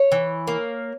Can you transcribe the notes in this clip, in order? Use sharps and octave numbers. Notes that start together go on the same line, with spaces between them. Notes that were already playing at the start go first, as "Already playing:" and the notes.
Already playing: C#5
E3
A#3